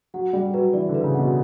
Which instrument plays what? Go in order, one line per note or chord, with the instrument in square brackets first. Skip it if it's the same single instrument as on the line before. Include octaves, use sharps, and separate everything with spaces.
[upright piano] F#3 [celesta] F#5
[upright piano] G3 [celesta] D5
[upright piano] F#3 [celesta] B4
[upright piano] E3 [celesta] D5
[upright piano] D3
[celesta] B4
[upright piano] C#3
[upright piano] B2 [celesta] F#5